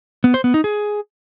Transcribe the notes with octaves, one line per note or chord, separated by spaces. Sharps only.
B3
C5
B3
D#4
G#4